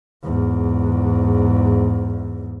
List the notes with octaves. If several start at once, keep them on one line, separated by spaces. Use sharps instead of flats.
E2 G#2